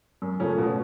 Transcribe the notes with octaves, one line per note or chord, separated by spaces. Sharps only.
F#2
C#3 F3 A3 C#4
B2